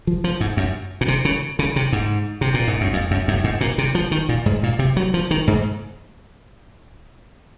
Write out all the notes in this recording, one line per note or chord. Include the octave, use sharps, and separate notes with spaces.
F3
F3
G#2
F#2
A#2
C3
C#3
C#3
C3
G#2
C3
A#2
G#2
F#2
F2
F#2
F#2
G#2
A#2
C3
F3
D#3
A#2
G#2
A#2
C3
F#3
F3
D#3
G#2